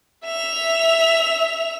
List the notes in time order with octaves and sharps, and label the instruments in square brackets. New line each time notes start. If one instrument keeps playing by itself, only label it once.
[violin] E5 F7